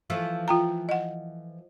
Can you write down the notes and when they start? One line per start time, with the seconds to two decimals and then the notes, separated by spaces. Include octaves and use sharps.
0.10 E3 F3 A3
0.48 F4 G5 A#5
0.89 D#5 F#5